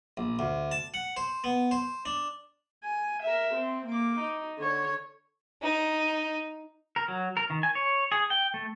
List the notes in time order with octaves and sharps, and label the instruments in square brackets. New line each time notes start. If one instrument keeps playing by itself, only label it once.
[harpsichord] A#1
D2
A5
F#5
C5
B3
C5
D4
[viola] G#5
A#4 E5
C4
A#3 D6
D#4
D3 C#5
[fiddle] D#4
[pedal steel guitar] A#4
F#3
A#4
D#3
G#5
C#5
G#4
G5
A3